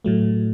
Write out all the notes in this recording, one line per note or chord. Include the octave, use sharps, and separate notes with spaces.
A2 F#3 A3